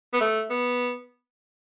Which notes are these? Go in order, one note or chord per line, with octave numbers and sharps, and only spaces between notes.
B3
A3
B3